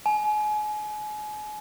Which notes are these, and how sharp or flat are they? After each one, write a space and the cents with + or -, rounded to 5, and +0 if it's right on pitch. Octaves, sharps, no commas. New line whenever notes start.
G#5 +30